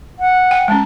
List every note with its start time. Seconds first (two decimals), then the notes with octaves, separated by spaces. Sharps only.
0.19 F#5
0.51 G5
0.68 G#3 C#4 A5